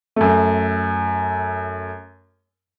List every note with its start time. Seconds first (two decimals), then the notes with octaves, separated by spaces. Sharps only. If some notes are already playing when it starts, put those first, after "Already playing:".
0.16 F#2 A3